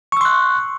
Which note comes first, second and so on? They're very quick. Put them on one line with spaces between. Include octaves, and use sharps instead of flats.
C#6 E6 C6 F#6